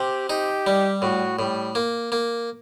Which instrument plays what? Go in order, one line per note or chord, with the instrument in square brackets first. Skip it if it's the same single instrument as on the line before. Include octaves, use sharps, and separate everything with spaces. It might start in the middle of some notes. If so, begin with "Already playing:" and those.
Already playing: [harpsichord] C3 [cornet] G4
[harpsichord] D#4 [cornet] G4
[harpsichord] G3
[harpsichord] A2 [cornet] F#4
[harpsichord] A2 [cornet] G3
[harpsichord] A#3
A#3